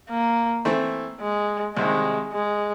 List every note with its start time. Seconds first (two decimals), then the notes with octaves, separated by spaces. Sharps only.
0.09 A#3
0.65 E3 A3 C4 E4
1.21 G#3
1.76 C2 C3 D#3 G#3
2.32 G#3